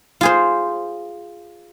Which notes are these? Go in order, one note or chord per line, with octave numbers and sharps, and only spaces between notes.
F4 G#4 C5